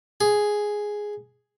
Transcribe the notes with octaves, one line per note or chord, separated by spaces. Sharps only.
G#4